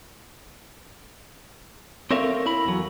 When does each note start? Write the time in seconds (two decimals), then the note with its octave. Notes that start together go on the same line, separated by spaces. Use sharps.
2.11 C4 A4 A#4 C#5 E5 F5
2.46 E4 A#4 B5
2.65 E2 F#3